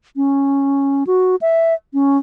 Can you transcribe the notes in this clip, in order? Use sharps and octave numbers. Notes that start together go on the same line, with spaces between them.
C#4
F#4
E5
C#4